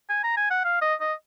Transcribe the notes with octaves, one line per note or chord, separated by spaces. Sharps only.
G#5
A#5
G#5
F#5
F5
D#5
D#5